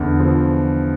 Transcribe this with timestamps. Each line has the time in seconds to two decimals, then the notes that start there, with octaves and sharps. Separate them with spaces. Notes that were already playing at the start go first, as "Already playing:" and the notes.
Already playing: E2 D3
0.19 F3